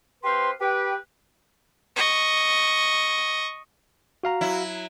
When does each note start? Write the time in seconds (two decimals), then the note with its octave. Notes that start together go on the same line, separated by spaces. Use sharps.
0.24 C4 G4 B4 C5 F5 C6
0.61 G4 B4 G5
1.96 D#5 C#6
4.23 F#4 F5 A#5
4.41 F#3 E4